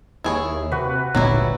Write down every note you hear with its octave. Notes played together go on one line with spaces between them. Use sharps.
D#2 E4 G#4 C#5
C3 F#4 B4
G#1 D2 A#2 F#3 G3 B3 E4